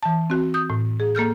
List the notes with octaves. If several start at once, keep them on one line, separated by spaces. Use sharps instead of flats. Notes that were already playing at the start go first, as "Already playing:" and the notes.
E3 A5
C4 F#4
D#6 G6
A2
G#4
A#3 A4 F6 G6